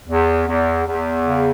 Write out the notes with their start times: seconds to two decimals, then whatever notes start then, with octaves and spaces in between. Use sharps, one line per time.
0.08 E2
0.47 E2
0.86 E2
1.26 C#3